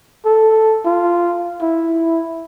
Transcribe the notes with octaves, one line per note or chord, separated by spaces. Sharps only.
A4
F4
E4